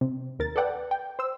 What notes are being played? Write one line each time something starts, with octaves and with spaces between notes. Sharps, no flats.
C3
D#2 A#4 A6
A4 B4 D5 F#5 G5
G5
C5 E6